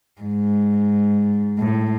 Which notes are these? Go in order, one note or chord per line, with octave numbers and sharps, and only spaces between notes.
G#2
A2